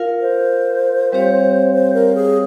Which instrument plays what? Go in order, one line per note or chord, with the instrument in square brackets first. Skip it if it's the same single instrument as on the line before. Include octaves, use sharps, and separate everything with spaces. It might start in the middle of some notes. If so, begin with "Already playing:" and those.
Already playing: [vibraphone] F4 A#4 F5
[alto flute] C5
[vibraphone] G3 C4 G4 C#5 F5
[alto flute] C5
A#4
G#4